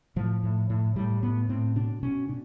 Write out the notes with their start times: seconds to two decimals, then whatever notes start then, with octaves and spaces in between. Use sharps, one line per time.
0.16 A2 F3
0.43 A2
0.70 A2
0.96 A2 G3
1.23 A2 B3
1.49 A2 C4
1.76 B2 D4
2.03 B2 C#4
2.29 B2 D4